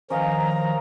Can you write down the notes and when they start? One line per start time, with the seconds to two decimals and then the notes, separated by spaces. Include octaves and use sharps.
0.10 D#3 F3 C#4 D#5 F5 A#5